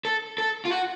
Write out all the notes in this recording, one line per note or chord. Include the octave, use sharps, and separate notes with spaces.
A4
A4
F4
F#4